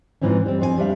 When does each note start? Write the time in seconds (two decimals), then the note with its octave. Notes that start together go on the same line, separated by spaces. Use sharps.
0.22 G#2 E3 F3 C4 C#4
0.46 G3 C4
0.60 F2 F3 C4 F#4 G#5
0.78 G3 D4 E5 F5